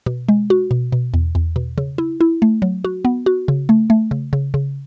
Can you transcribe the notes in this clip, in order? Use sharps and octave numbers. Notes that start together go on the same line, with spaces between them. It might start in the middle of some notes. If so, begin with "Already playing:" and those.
B2
G#3
F#4
B2
B2
E2
E2
B2
C#3
E4
E4
A3
F#3
F#4
B3
F#4
C#3
A3
A3
C#3
C#3
C#3